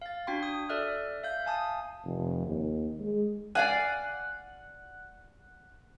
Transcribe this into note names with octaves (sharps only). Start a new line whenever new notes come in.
F5 A6
D4 F#4 G5 C6
D#6
A4 D5 E5 F6 F#6
E5 F5 G6
F5 G#5 A5 D#6
F1
D#2
G#3
D5 F5 F#5 G#5